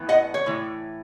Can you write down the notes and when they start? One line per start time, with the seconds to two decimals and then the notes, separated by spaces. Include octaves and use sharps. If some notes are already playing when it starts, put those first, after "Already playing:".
Already playing: A2 E3 B3
0.09 D#5 F#5
0.34 C#5
0.46 A2 E3